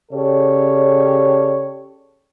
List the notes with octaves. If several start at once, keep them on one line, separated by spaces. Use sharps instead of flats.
C#3 G4 A4 C#5 D5